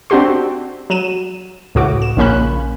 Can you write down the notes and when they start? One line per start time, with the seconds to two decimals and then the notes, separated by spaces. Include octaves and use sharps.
0.10 C4 D4 F#4 G4 C6
0.90 F#3 D#7 E7
1.75 C#2 A2 F#4 D6
2.02 E7
2.17 A#1 C#3 A#3 C#4 B5 F#6